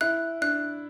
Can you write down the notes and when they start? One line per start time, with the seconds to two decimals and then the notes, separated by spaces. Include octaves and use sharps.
0.01 E4 F#6
0.41 D4 F#6